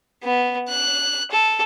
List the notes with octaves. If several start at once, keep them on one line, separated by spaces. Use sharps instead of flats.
B3
F#6
A4